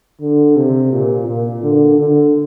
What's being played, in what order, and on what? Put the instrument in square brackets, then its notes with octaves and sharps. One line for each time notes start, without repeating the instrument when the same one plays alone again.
[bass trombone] D3
C3
A#2
A#2
D3
D3